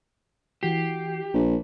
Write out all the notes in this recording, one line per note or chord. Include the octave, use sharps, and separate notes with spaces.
E3 F#4 G4 C7
A#1